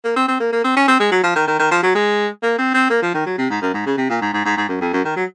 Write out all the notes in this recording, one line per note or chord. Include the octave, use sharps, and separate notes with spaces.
A#3
C4
C4
A#3
A#3
C4
C#4
C4
G#3
F#3
F3
D#3
D#3
D#3
F3
F#3
G#3
A#3
C4
C4
A#3
F3
D#3
F#3
C3
G#2
F#2
G#2
C#3
C3
A#2
G#2
G#2
G#2
G#2
F#2
F2
F#2
D#3
F#3